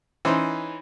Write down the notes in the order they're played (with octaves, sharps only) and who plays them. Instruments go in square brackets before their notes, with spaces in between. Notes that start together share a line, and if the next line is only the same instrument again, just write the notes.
[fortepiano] E3 C#4 D#4 C5